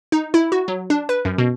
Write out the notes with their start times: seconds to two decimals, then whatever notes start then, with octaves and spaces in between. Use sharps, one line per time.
0.12 D#4
0.34 E4
0.52 F#4
0.68 F#3
0.90 D4
1.09 B4
1.25 F#2
1.38 B2